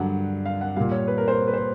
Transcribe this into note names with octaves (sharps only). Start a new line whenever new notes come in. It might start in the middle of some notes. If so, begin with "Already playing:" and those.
Already playing: G2 D3 F#3 F#5
F5
F#5
A#2 G3 F5
C#5
B4
A#4
C5
B4
C5